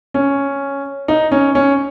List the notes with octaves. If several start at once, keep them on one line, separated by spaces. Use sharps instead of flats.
C#4
D#4
C#4
C#4